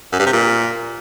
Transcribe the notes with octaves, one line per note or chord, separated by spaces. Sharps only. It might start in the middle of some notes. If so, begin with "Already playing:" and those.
F#2
G2
C3
A#2